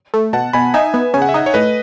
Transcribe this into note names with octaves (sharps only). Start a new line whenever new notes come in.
A3
B2 F#5 A5
B2 G#5 B5
D#4 E5 G#5
B3
C#3 G#5
F#5
E5
D#4 D#5 F#5
C#5
A2 B4 D#5